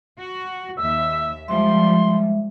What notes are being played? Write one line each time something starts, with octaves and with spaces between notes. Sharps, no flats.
F#4
D#2 E5 E6
F3 G3 G#3 E5 C6